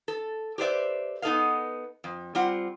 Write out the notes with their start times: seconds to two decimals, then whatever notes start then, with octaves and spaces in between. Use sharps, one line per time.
0.08 A4
0.58 G4 B4 C5 D5 E5
1.22 B3 D#4 A4 B4 D#5 F5
2.04 F2
2.35 G3 C4 F4 F#5